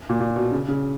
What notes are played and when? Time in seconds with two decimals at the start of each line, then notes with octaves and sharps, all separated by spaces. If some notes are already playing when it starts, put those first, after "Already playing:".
0.09 A#2
0.20 A#2
0.36 B2
0.52 C#3
0.68 C#3